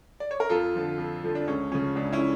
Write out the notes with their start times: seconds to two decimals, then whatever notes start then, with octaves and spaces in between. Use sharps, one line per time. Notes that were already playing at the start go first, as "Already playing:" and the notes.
0.20 D5
0.31 C#5
0.40 A#4
0.49 F2 F4 A4
0.75 D3 F3
0.98 F2
1.23 D3 F3
1.35 D4
1.47 C#2 C#4
1.72 C#3 F3 C#4
1.96 C#2 D4
2.13 C#4 E4